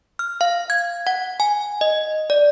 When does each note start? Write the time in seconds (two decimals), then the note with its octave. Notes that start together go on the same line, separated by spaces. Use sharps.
0.19 F6
0.41 F5
0.70 G#6
1.07 F#5
1.40 G#5
1.81 D#5
2.30 D5